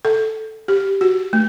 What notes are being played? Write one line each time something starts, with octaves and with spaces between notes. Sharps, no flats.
A4
G4
F#4
A3